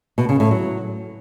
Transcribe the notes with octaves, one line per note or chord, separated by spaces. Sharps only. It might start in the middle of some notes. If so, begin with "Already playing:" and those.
B2
C#3
A2
F#3